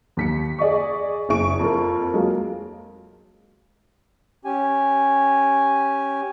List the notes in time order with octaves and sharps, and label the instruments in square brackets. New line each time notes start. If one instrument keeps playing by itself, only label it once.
[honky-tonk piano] D#2 B6 C#7
G#4 D5 D#5 C#6
F#1 E4 G#4 C#6 D7
F2 A#4
F#3 G#3 A#3
[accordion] C#4 G4 G#5